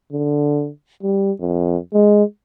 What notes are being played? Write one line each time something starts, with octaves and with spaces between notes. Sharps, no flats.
D3
G3
F2
G#3